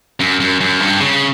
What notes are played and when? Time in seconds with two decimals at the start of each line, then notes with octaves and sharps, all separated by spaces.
0.20 F#2
0.40 F#2
0.60 F#2
0.80 G2
1.01 C#3